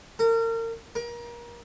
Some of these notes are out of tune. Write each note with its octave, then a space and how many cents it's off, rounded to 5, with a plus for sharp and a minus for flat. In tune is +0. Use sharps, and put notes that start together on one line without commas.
A#4 -35
A#4 +30